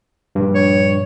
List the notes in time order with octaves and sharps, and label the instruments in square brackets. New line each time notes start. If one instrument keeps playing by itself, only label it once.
[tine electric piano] A#1 G2
[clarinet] C#5